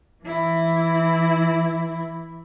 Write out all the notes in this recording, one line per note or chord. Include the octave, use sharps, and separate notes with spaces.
E3 E4